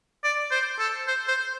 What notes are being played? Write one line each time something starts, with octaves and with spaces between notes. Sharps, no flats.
D5
C5
A4
C5
C5